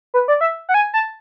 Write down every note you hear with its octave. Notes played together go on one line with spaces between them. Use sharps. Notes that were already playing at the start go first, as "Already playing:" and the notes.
B4
D5
E5
F#5
G#5
A5